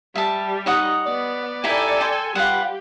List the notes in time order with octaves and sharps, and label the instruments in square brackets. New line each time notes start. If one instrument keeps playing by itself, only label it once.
[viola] G3 [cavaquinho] E5 A5
[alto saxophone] D#4 [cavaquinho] C#5 D#5 F#5
[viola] B3 [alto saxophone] D5
[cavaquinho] D#4 E4 G4 [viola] A4 G#5
[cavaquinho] G5 C6
[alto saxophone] G3 [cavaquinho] F4 B4 F#5 [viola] G4